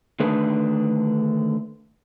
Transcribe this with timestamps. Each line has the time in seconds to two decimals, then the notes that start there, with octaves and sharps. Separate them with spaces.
0.20 D3 D#3 A3 D4 G#4 B4